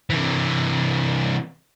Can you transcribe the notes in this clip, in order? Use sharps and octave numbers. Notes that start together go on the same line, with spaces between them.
C3 E3